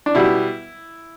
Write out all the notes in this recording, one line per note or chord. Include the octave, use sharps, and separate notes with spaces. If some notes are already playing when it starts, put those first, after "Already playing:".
D4
B2 G3 B3 E4